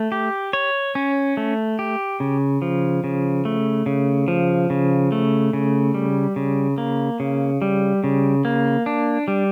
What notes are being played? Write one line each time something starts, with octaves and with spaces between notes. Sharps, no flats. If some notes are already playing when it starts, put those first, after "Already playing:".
Already playing: A3
G4
C#5
C#4
A3
G4
C#3
F3
C#3
A3
C#3
F3
C#3
A3
C#3
G3
C#3
A#3
C#3
G3
C#3
A#3
D4
G3